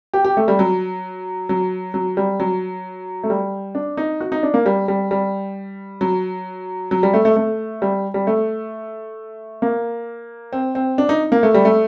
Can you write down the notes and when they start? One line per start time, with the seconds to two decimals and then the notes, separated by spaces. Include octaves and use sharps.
0.14 G4
0.25 G4
0.37 A3
0.48 G3
0.59 F#3
1.49 F#3
1.94 F#3
2.17 G3
2.40 F#3
3.24 A3
3.30 G3
3.75 D4
3.97 D#4
4.21 F#4
4.32 D#4
4.43 D4
4.54 A#3
4.66 G3
4.88 G3
5.11 G3
6.01 F#3
6.91 F#3
7.03 G3
7.14 A3
7.25 A3
7.36 A3
7.82 G3
8.14 G3
8.27 A3
9.62 A#3
10.53 C4
10.75 C4
10.98 D4
11.09 D#4
11.32 A#3
11.43 A3
11.54 G3
11.65 A3